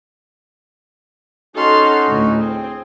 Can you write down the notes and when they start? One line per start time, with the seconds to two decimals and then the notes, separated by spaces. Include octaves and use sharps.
1.56 C#4 D#4 F#4 A4 C6 F6
2.07 D2 A2
2.38 C4 G#4